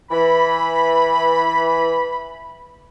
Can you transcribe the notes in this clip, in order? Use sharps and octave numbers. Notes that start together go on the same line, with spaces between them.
E3 B5